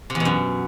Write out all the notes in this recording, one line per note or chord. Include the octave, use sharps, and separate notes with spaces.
C3
E2
B2
F#2